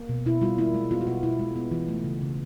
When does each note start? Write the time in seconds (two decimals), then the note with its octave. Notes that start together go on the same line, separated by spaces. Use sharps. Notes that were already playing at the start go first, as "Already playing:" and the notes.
Already playing: A#3
0.09 B2
0.26 B2 E4
0.42 G3 F4
0.58 A#3 E4
0.74 G#3
0.91 B3 F4
1.01 F#4
1.07 B2 F4
1.23 B2 E4
1.39 G#3
1.56 B3
1.71 E3 F4
1.88 A3
2.04 C#3
2.21 C#3